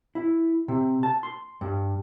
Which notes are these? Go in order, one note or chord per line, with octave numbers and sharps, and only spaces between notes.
E4
C3
A5
C6
G2